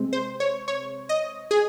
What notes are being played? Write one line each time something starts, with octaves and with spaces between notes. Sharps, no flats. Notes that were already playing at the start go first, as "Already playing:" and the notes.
Already playing: C3 G#3 C4
C5
C#5
C#5
D#5
G#4